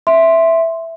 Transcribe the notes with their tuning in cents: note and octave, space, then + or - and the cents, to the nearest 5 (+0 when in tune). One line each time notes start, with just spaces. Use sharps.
E5 +0 C6 +0